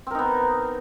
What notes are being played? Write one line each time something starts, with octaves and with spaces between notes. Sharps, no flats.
B3 C4 D#4 A#4